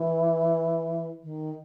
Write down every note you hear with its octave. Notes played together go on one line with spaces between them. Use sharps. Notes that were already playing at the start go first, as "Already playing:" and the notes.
Already playing: E3
D#3